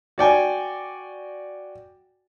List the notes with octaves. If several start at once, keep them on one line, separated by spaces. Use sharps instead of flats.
F#4 D5 G5 G#5